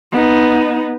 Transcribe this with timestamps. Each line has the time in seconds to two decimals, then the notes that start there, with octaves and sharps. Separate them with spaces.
0.12 B3 D#4